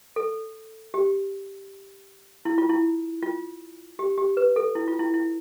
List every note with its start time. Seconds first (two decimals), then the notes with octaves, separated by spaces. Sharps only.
0.16 A4
0.94 G4
2.45 E4
2.58 F4
2.69 E4
3.22 F4
3.99 G4
4.18 G4
4.37 B4
4.56 A4
4.75 E4
4.88 F4
4.99 E4
5.14 E4